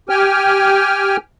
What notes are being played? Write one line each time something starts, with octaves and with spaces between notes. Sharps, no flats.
G4 G5 G#5 F6